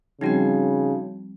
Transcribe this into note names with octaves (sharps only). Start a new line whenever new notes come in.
C#3 F3 G3 C4 D#4 F#4 G5